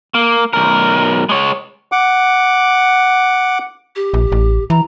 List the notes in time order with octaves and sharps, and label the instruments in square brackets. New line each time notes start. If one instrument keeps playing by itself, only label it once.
[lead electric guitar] A#3
B1 A#4
G#3 C#5
[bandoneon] F#5 D6
[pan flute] G4
[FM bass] A#1
A1
[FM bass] E3 [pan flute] A#5